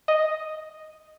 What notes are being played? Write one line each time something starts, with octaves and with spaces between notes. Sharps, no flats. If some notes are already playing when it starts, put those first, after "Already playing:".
D#5